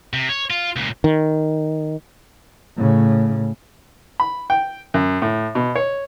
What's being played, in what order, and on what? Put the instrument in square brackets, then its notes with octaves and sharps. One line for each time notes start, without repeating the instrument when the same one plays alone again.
[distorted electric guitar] C3
C#5
F4
C#2 A#2
[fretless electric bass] D#3
[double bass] A2 C#3
[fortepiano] B5
G5
F#2
A2
B2
C#5